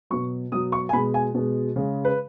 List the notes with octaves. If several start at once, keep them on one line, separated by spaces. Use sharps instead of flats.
B2 F#3 C#6
B2 F#3 D#6
C#6
G#5
B2 G#3 B5
G#5
B2 G#3
C#3 G#3
B4